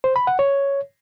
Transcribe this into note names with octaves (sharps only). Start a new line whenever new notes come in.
C5
B5
F#5
C#5